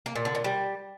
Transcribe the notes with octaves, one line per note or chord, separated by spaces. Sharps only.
A#3
A#2
D3
A#2
G3